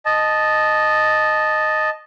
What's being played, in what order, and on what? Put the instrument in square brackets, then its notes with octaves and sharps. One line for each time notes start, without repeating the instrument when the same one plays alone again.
[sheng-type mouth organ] D#5 A5